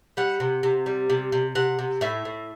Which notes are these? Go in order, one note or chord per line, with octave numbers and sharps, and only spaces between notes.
G3 F#5
C3
C3
G3
C3
C3
C3 F#5
C3
A2 E5
A2